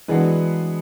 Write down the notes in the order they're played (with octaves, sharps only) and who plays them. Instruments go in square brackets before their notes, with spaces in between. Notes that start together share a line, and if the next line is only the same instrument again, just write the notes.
[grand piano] E3 G#3 [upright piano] F#3 B3 D4 G#4 B4